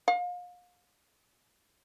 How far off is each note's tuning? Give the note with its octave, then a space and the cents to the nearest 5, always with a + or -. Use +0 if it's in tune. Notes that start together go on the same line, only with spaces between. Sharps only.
F5 +35